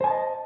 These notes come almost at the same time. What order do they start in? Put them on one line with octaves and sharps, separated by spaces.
C5 G#5 A5 D#5